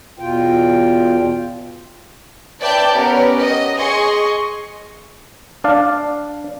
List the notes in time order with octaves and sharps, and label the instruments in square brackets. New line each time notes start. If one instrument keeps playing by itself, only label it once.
[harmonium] E2 B2 F4 G5
[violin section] B4 D5 E5 G5 A5 G6
B3 C#4 G4 A#4
D#5
G#4 D#5 C6 C#6
[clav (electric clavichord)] D4 D5 F5